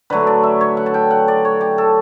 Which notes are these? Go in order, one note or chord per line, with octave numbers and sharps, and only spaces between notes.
D3 F#3 A3 B4
D5
E5
C#5
F#5
A5
G5
F#5
D5
C#5
G4
A4